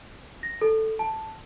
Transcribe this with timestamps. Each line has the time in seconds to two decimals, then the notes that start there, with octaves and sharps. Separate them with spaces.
0.43 A#6
0.61 A4
0.99 A5